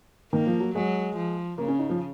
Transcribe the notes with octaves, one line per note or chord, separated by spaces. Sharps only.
D#3 A#3
F3
F#3
F#3 G#3
F3
C#3 A#3
C#4
D#4
F3